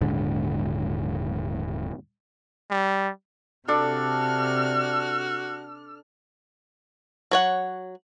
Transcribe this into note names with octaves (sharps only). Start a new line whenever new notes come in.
D#1 G#2 D3
G3
C3 D4 F#4 A4 F6
F#3 C#5 F#5